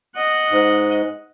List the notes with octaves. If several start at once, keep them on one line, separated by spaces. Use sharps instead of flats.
D#5 F#5
G#2